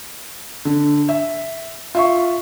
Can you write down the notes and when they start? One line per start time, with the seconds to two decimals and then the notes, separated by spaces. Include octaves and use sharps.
0.65 D3
1.09 E5
1.95 F4 E5 C#6